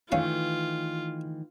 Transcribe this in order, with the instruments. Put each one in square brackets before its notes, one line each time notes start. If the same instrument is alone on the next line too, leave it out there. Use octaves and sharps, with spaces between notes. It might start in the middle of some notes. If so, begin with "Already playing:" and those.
[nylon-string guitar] D#3 E3 A3 [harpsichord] C#4 F5 [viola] F4